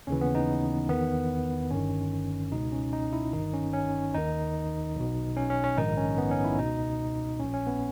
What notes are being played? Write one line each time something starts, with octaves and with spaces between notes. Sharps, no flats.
D#2 C#3 E3 C#4
B3
D#4
E2 D#3 B3
G1 G2 D#3 C#4
C#2 B2 D#4
C#4
D#4
E4
G1 G2 D#3 D#4
C#4
C#4
D#2 D#3 D#4
B1 B2
C#4
C#4
C#4
A#1 G#2 D#3 D#4
C#4
B3
C#4
E4
C#2 B2 D#4
A#1 A#2 C#4
C#4
B3